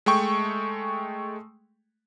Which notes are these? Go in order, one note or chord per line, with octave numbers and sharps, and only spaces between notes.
G#3 A3 G5 C#6